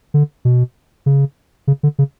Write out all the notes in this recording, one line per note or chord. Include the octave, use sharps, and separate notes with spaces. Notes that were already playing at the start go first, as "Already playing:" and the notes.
D3
B2
C#3
C#3
D3
C#3